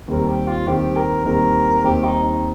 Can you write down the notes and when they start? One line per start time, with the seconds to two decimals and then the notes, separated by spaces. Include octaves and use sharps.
0.08 D#2 D#3 G3 C4 A#4
0.27 G4
0.47 F4
0.67 D#2 D#3 G3 C4 G4
0.96 A#4
1.25 D#2 D#3 G3 C4 A#4
1.84 D#2 D#3 G3 C4 G4
2.04 D#4
2.23 D#4